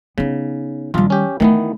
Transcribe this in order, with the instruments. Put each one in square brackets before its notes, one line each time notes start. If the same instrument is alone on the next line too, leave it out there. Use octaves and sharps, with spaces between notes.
[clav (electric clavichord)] C#3 [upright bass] B3 D#4
[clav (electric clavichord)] A#1 F4 [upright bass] D#3 G3
[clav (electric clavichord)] C#4 G4
[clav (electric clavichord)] D#3 E3 B3 [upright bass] A3 E4